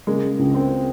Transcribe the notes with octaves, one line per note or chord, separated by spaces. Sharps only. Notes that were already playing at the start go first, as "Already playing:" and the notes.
C#3 G#3 A#3
C#2
A#3 C4